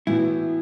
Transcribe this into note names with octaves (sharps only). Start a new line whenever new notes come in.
A2 E3 B3 E4 F#4